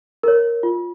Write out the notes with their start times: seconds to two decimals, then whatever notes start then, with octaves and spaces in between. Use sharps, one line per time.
0.23 A#4 C#5
0.63 F4